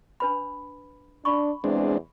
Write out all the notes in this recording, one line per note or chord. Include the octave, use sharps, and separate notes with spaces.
D4 B4 B5
D4 B5 C#6
E2 G#3 C4 D4